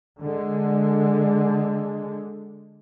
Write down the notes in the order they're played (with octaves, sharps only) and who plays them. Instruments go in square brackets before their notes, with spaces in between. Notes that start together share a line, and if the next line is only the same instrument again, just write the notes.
[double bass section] D3 G#3